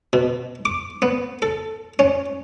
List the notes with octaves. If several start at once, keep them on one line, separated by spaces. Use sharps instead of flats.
B2
D6
B3
A4
C#4